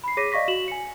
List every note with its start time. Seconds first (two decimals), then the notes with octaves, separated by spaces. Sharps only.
0.04 B5 C7
0.17 G#4 C#5 D6 A#6 B6 D#7
0.32 D5 D#5 F5 C#6 A#6 B6
0.48 F#4 E7 F#7
0.68 G#5 C#7